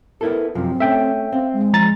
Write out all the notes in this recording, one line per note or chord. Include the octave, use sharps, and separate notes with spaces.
B3 E4 A4 A#4
F#2 C3 F3 C4
A3 C#4 E5 G5
C4 F5
G#3
F3 A#5 A6